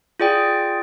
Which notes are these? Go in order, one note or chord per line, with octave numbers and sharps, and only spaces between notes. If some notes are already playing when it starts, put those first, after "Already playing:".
F4 G#4 D5 G5